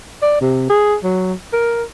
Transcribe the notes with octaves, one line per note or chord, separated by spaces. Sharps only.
D5
C3
G#4
F#3
A#4